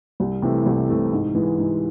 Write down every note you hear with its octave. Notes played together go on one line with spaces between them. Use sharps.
C2
C3 E3 A3
C2
C3 E3 A3
G#2
E3 G#3
G#2